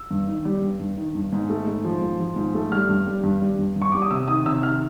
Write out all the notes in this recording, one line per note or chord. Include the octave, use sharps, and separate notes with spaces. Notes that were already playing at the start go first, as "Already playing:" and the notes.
Already playing: E6
G2
D#3
G3
G2
G2
D#3
G2
G#2
A3
G#2
F3
G#2
F3
G#2
A3
G3 F6
G2
G3
G2
G3
G2
G2
C#6
G3 D6
D#6
C3 E6
D#3 D#6
C3 E6
D#3 F6